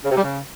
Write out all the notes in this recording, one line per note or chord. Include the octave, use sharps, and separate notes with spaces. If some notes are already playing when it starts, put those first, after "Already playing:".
C#3
C3
G3
C#3